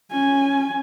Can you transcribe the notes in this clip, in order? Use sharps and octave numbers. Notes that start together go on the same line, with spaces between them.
C#4 G#5